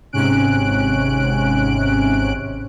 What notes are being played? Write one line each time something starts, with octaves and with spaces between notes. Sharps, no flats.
G#1 G#2 C3 C#4 F#6 D7